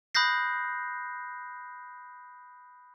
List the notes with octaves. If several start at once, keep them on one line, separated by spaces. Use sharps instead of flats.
B5 D#6 F#6 G6 A#6 C7